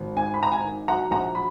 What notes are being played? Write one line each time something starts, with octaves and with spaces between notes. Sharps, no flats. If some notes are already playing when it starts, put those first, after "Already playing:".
Already playing: G#1
G#2 G#5
B5
G#1 A#5
G#5
D#3
F#3 F#5 A#5
A#1 F#5 A#5
F#3 B5